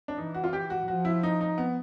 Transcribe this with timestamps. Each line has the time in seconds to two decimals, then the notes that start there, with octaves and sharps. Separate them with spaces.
0.08 D4
0.18 E3 D#4
0.34 F#4
0.44 F4
0.53 G4
0.70 F#4
0.87 F3 F#4
1.05 E4
1.23 D#4
1.41 D#4
1.58 B3